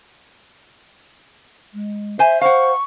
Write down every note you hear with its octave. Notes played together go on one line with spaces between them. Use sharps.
G#3
C5 E5 G#5
C5 F5 F#5 C#6